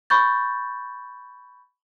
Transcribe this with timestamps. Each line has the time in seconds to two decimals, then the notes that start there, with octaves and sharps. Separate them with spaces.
0.10 B5 C#6 G6 A6